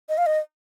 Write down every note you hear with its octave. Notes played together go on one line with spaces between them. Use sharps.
D#5
F5
D#5